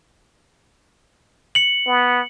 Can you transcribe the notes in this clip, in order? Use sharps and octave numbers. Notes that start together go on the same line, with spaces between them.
C#7 F#7
B3